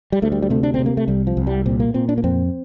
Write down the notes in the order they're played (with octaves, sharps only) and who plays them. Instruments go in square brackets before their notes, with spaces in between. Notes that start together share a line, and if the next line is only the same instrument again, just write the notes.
[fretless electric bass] G3
D2 A3
G3
G3
C3 A3
D4
C3 C4
A#3
A3
C2 G3
F3
C2
G3
A#2 C4
A#3
A#2 C4
D4
A#3
F2 C4